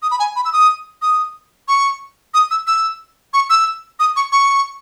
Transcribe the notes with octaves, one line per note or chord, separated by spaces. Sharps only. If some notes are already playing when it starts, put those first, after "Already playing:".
D#6
B5
G#5
B5
E6
D#6
D#6
C#6
D#6
E6
E6
C#6
E6
D#6
C#6
C#6